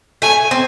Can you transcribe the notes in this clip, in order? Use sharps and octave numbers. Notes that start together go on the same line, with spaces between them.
A3 G#5
C4